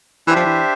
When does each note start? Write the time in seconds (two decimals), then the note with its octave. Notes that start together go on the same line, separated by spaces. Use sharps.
0.27 E3 D4 G4 C5 E5
0.36 F3
0.45 E3